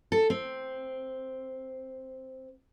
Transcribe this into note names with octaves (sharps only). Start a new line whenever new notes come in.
A4
C4